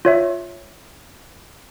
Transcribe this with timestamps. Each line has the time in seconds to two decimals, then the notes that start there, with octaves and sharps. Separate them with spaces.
0.05 F4 C#5 E5